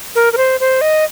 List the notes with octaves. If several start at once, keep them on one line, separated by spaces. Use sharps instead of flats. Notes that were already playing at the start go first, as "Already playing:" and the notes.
A#4
A#4
C5
C5
D#5